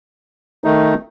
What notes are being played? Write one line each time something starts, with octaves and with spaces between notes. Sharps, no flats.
D#3 A3 D#4